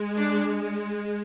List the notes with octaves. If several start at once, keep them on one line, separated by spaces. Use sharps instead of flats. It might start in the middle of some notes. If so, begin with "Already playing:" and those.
Already playing: G#3
D4